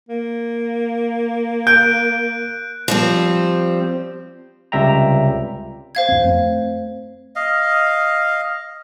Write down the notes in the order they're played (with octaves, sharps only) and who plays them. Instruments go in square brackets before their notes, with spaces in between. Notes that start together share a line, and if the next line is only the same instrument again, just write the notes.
[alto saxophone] A#3
[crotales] F#6 D7 [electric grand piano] G6
[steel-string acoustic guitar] F3 G3 C4
[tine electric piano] C#2 C3 G3 E5 G5 A#5
[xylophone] C5 F5 G#6
[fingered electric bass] F2 C4
A3 C4
[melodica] D#5 F5